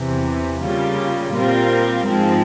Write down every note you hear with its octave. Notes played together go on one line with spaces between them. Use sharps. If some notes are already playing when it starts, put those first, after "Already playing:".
Already playing: E2 C3 E3
C#3 G3 A#3 F4
A#2 G3 C4 F4 A#4
G#2 F3 G#3 C4